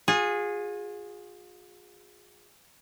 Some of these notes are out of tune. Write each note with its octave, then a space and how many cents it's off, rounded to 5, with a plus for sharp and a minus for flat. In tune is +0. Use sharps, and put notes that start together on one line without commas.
F4 +40 G#4 -10